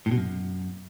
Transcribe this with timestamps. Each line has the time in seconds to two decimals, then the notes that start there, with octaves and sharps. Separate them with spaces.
0.06 A2
0.11 B2
0.17 F#2